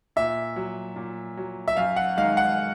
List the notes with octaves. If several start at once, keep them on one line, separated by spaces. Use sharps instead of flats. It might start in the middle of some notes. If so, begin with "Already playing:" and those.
A#2 E5
F#3
A#2
F#3
E5
F#2 F5
F#5
D#3 G#3 F5
F#5